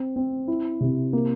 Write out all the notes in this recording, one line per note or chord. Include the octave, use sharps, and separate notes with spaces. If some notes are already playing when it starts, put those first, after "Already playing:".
Already playing: C4
C4
E4
C3
A#3